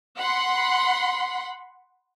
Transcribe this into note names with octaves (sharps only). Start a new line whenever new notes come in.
F#5 B5 C6